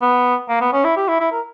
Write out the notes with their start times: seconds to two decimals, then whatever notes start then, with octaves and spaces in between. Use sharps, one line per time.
0.02 B3
0.49 A#3
0.61 B3
0.73 C#4
0.84 E4
0.97 G4
1.08 E4
1.20 E4
1.32 A#4